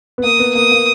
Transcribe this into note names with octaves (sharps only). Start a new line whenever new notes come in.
B3
A#3 D#6
B3
A#3 D#6
A#3